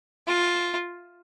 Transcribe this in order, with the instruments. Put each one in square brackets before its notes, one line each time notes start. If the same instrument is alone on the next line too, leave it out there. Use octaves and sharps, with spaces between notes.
[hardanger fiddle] F4